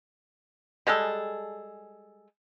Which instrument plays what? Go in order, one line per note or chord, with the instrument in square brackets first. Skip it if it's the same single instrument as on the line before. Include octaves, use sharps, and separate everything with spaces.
[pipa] G3 G#3 G#4 A4